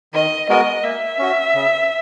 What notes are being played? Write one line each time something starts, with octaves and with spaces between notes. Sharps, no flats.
D#3 D#5
G#3 B3 F#4 A#4 D#5
A#3 E5
C#4 F#4
C#3